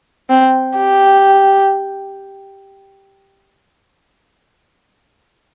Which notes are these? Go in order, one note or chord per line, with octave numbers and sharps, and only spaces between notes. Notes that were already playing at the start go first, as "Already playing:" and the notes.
C4
G4